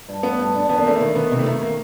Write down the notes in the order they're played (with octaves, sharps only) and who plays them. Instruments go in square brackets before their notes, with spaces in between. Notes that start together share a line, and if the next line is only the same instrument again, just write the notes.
[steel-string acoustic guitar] G2
[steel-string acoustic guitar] A3 [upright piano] B3
[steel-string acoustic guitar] G2
D4
[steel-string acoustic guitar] E2 [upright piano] B3
[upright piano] A#3
[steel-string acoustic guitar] E2 [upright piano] A3
[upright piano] A#3
[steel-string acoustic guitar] D#3
[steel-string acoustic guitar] D#3 [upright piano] B3
[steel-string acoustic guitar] C3
[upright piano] A3
[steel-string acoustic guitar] D#3
[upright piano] A#3